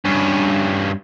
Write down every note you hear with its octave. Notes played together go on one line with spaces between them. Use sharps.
G2 C#4